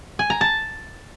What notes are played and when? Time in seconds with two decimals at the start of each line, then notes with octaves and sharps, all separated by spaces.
0.19 G#5
0.30 A#5
0.41 A5